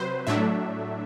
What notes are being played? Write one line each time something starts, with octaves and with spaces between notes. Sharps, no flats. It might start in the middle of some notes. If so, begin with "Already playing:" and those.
Already playing: C3 F#3 B4 C5
A2 F#3 A3 D4 E5